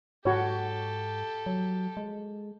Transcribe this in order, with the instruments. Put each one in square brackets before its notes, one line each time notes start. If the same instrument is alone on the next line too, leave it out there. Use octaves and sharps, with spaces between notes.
[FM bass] G#2 [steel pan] F#4 C#5 [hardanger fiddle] G4 A4
[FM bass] F#3
G#3